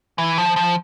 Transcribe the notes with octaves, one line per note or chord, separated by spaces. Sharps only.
E3
F3
F3